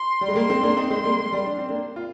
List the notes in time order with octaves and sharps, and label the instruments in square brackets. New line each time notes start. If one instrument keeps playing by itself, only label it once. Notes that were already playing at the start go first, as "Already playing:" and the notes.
Already playing: [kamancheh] C6
[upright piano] G3
G#3
[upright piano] G3 A#3 [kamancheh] C6
[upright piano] G#3 C4
A#3 D4
C4 D#4
[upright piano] G#3 C4 [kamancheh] C6
[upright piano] G3 A#3
G#3
G3
D4
C4
A#3 D4
F4